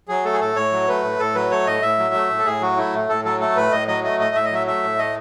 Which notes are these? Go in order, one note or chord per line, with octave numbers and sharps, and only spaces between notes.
F#3 G#4
A3 A4
G#4
A2 A4
A2 C#5
F#3
A3 B4
A2
A2 A4
F#3 B4
A3 C#5
A2 D#5
A2 E5
F#3
A3
A2
A4
A2 G#4
F#3 F#4
A3 E4
A2
A2 A4
F#3 A4
A3 A4
A2 B4
A2 D#5
F#3 D#5
A3 D#5
A2 D#5
A2 E5
D#5
F#3 E5
A3 E5
A2
A3 D#5